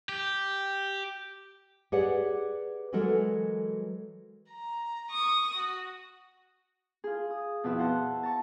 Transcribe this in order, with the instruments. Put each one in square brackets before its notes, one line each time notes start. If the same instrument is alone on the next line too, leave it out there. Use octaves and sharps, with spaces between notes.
[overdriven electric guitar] G4
[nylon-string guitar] G4 G#4 B4 C#5 D5 F#5
E3 F#3 G#3 F#4 A4 A#4
[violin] A#5
C#6 D#6
F#4
[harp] F4 G#4
D#6
F2 B2 F3 E4 B4 E6
C5 F#5 A5 F#6
A5 A#5 C#6